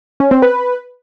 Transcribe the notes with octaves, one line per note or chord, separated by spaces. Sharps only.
C#4
C4
B4